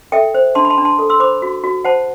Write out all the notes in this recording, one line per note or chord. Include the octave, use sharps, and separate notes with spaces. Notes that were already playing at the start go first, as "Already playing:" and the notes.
A4 E5 G5
C5
D4 A5 C6
B5
A5 C6
D4
A5 C6
A4
C6 E6
C5 B5 D6
F#4
F#4
C5 F#5 A5